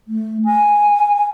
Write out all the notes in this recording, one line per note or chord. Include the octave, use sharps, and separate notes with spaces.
A3
G#5